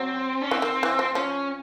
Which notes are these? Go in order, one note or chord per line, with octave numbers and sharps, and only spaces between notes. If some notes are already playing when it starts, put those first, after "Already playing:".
Already playing: F#3 C4
C#4
E3 C4
D#3
E3
F3
F3 C#4